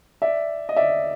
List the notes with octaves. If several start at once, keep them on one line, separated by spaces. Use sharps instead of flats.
D5 E5
D#5
D5 E5